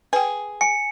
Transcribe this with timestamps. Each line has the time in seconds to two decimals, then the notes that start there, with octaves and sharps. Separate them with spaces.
0.13 G#4 B4 G5
0.61 G#5 C#7